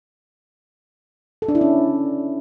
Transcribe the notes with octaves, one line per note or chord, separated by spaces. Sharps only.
A4
D4
E4
C#4